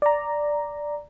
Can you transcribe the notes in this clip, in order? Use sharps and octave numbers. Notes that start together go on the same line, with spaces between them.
D5 A#5